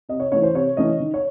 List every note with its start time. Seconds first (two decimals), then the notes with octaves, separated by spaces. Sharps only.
0.09 C3 D#5
0.20 C#5
0.32 E3 A3 C#4 C#5
0.43 C5
0.54 C3 C#5
0.77 E3 A3 C#4 D#5
1.00 D#3
1.14 C#5